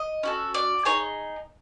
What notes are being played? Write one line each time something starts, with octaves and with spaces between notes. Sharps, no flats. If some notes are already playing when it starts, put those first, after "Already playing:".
Already playing: D#5
C#4 F#4 A4
D5
D#4 G#4 C#5